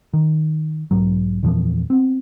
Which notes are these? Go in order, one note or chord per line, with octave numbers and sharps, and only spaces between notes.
D#3
B1 G#2 F#3
E2 A#2 E3 F3
B3 C4